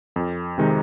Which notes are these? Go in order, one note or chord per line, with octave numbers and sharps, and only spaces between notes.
F2
C3 D#3 G#3 D#4